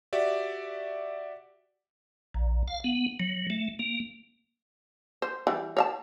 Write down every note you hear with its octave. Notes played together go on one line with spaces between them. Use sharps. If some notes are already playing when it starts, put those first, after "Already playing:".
F#4 G4 D5 E5
A#1
F5
B3
F#3
A3
A#3
C5
E3 G3
C#5 F5 A5